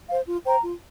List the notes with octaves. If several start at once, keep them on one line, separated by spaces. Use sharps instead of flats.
C5 F5
F4
C5 G5 A#5
F4